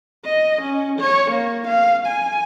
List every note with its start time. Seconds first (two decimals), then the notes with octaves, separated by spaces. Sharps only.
0.25 D#5
0.62 C#4
0.99 C#5
1.31 A#3
1.67 F5
2.06 G#5